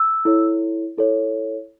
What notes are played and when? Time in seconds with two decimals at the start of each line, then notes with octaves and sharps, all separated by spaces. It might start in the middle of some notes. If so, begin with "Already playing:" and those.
Already playing: E6
0.25 E4 A4 C#5
0.97 E4 A4 C#5